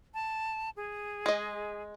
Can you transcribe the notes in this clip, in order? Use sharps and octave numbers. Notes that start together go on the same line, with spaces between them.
A5
G#4
G#3 D#5